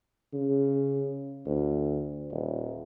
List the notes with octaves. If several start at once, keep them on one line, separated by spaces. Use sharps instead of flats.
C#3
D2
D#1